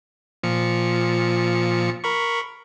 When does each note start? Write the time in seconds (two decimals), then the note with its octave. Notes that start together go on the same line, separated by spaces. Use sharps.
0.43 A#2 F3 C#7
2.04 A#4 B5 C#6